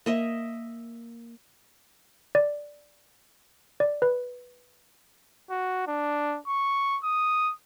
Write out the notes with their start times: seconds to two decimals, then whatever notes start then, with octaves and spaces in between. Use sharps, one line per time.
0.06 A#3 D#5 E5
2.35 D5
3.80 D5
4.02 B4
5.51 F#4
5.87 D4
6.48 C#6
7.04 D#6